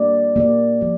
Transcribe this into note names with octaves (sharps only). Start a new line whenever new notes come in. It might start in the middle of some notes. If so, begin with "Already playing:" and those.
Already playing: A#3 G4 D5
A#3 G4 D5
F3 A#3 G4